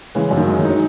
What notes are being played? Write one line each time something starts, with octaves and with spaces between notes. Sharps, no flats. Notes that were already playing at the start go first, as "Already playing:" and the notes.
C#3 E3 G#3
F#2
D#3 F#3
G#3
D#3 F#3
D#4
F#3